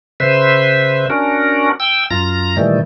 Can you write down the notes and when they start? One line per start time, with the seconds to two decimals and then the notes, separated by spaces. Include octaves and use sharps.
0.20 C#3 B4 C5 E5
1.10 C#4 D4 F#4 A#4
1.80 G5 E6
2.10 F#2 F4 A#5 A#6
2.57 A#2 D#3 E3 G3 A3